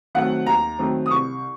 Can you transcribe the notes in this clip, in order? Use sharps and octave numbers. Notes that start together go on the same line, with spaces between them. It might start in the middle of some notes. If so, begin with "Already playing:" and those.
D#3 F#3 A3 C4 F#5
D#2 A#5
D#3 F#3 A3 C4
D#6
C2 C#6